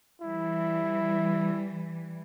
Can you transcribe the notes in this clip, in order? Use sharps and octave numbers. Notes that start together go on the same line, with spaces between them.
E3 G3 E4